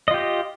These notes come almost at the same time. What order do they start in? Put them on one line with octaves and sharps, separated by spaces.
D#5 F4 G4